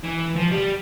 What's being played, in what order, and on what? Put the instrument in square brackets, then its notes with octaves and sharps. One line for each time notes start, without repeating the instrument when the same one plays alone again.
[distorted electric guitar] E3
F3
G3